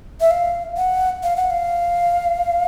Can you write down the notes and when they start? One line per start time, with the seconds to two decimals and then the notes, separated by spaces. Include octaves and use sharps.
0.21 E5
0.31 F5
0.77 F#5
1.23 F5
1.36 F#5
1.50 F5